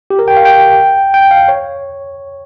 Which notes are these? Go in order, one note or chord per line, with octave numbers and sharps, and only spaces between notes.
G4
A#4
G5
F5
G5
G5
F5
C#5